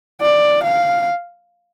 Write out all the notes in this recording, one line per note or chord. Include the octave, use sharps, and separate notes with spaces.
D5
F5